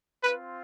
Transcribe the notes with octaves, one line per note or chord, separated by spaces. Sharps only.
C4 F4 B4